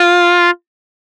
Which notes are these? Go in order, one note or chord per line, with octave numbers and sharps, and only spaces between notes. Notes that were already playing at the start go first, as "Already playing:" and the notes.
Already playing: F4